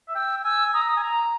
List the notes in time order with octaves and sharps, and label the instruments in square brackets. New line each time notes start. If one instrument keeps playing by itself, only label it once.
[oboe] E5
[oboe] G5 [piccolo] E6
[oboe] G#5 [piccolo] E6
[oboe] A#5 [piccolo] D#6
[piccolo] E6
D#6
[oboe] G#5
A#5